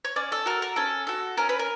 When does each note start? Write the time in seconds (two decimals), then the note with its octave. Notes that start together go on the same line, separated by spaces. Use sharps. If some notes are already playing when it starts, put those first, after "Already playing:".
0.05 C#5
0.16 C#4 D5
0.32 A4
0.46 F#4 A4 A#4
0.62 A#4
0.76 C#4 A4
1.07 F#4 A4
1.37 C#4 A#4
1.49 B4
1.59 A#4